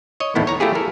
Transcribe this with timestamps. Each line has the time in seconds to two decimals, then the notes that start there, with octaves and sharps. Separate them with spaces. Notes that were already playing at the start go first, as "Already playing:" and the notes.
0.20 C#5 D#5
0.35 E2 A2 D#3 B3 E4
0.47 C#5 A#5
0.60 A3 E4 F4 G4 G#4
0.75 A4 A#4